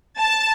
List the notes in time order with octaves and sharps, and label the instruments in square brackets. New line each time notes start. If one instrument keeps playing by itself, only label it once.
[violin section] A5